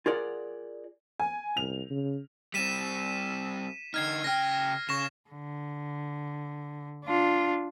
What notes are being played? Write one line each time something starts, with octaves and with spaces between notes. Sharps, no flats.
F4 G#4 A#4 D5 F#5
G#5
C2 F7
C#3
G3 C4 B6 D#7 E7
D3 D#4 F6 G#6 C7
C#3 G5 F6 A#6
C#3 C#6 A#6 E7
D3
D4 F4